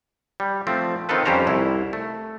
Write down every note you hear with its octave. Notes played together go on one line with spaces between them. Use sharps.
G3
F3 A3 C4
D#3 C4 F4 A4 B4
F2 G3 C#4 G4 C5 A#5
C2 E4
A3